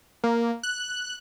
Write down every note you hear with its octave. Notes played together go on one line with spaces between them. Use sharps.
A#3
F#6